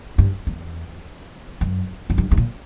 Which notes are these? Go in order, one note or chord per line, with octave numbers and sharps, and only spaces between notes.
G2
E2
F#2
F#2
G2
G2
A#2